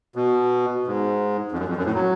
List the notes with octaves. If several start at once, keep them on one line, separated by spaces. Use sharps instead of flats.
B2
G#2
F2
F#2
F2
F#2
A2
F#3